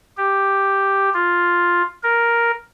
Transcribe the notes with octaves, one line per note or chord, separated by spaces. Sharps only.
G4
F4
A#4